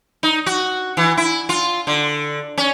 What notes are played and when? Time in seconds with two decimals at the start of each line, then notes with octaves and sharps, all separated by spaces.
0.23 D#4
0.46 F#4
0.97 E3
1.17 E4
1.49 F4
1.87 D3
2.58 C#4